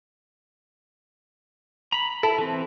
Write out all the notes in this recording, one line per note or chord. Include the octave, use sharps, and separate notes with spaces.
A#5 B5
E4 A4
E3 C4